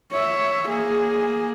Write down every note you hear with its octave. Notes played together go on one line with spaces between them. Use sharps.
C#5 E5
A#3 G#4